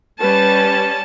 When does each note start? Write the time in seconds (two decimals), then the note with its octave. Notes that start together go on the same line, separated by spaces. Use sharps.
0.20 G3 C#4 B4 A5